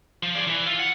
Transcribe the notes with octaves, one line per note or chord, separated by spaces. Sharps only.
F3
G#4 D5
E3
F4
F#5